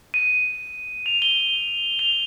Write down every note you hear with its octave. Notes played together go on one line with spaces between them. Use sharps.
D#7
F7
G7
F7